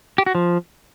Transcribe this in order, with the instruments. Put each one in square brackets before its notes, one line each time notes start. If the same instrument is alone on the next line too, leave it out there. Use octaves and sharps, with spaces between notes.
[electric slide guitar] G4
F#4
F3